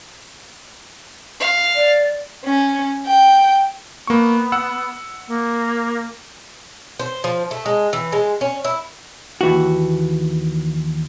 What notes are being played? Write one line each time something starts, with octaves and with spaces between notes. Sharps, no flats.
F5
D5
C#4
G5
A#3 B3 C#6
F#5 E6
A#3
C5
F3
A3
G#3
E3
G#3
C#4
E4
D#2 E3 F#4